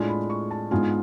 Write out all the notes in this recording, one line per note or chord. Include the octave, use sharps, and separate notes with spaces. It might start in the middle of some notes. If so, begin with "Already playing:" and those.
Already playing: A2 G#3 D4 F4 G#5
B5
C#6
A5
G#2 G#3 B3 D4 F4 G#5